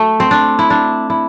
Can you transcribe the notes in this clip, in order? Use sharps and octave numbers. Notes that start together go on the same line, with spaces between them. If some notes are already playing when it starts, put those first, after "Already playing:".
Already playing: A3
C4
D4
E4
D4
E4